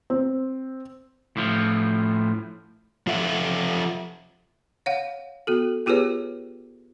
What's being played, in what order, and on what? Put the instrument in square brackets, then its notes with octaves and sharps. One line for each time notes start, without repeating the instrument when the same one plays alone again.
[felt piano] C4
[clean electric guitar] A2 F3
[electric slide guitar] F3 F4 A4 E5 F#5
[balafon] C#5 F5 F#5
B3 F#4 A4
B3 F4 G4 G#4 B4 C#5